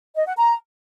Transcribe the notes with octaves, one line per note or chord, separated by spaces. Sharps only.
D#5
F#5
A#5